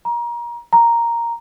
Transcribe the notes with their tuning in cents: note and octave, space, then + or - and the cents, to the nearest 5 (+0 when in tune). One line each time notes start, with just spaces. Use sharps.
A#5 +30
A#5 +0